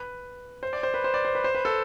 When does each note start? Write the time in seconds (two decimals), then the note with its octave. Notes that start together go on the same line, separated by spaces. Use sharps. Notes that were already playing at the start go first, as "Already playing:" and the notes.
Already playing: B4
0.63 C5
0.73 D5
0.83 C5
0.94 B4
1.04 C5
1.14 D5
1.25 C5
1.35 B4
1.44 C5
1.55 B4
1.65 A4